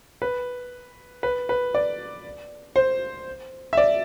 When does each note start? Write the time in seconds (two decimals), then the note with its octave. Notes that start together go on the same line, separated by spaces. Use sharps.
0.22 B4
1.23 B4
1.49 B4
1.74 D5
2.76 C5
3.73 E5
3.77 D5